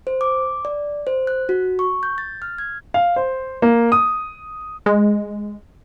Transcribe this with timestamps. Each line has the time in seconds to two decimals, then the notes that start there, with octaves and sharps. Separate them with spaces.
0.07 C5
0.21 D6
0.65 D5
1.07 C5
1.27 F#6
1.49 F#4
1.79 C#6
2.03 G6
2.18 A6
2.42 F6
2.58 G#6
2.94 F5
3.16 C5
3.62 A#3
3.92 D#6
4.86 G#3